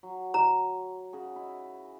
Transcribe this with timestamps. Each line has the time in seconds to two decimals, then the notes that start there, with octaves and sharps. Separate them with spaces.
0.03 F#3
0.34 A#5
1.13 C#3 F#4 G#4
1.36 E4